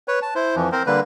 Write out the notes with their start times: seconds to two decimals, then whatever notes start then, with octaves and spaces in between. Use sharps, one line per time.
0.08 B4 C#5
0.22 A5
0.35 E4 C5
0.56 F2 E3 F3
0.72 C4 A#4 C5
0.86 D3 G3 A#3 B4